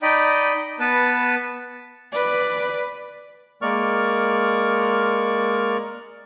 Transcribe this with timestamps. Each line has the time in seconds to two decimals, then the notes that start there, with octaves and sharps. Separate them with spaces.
0.03 D#4 D5 D#5 G5 B5
0.80 B3 B4 A5
2.12 B4 D5
3.62 G#3 A#3 A#4 D5 C#6 F6